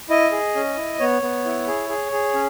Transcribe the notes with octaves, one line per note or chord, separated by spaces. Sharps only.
E4 D#5
G#4
C#4
E4
B3 C#5
B3
E4
G#4
G#4
G#4
C#4